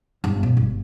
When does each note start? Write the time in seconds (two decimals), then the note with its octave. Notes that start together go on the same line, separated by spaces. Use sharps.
0.24 G1
0.43 B2
0.57 G1